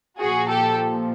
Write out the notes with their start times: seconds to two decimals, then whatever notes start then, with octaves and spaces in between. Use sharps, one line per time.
0.20 A#2 F3 F#4 G#4
0.49 G4 A4